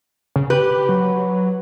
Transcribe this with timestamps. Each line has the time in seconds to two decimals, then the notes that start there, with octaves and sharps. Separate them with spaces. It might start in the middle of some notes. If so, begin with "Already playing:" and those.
0.36 C#3
0.50 G4 B4
0.89 F#3